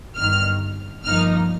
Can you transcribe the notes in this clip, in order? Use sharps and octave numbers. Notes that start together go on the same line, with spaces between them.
G1 G2 D#3 F6
G1 G2 F3 A#3 D#4 F6